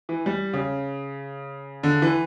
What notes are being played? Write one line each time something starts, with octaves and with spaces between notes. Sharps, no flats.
E3
G3
C#3
D3
E3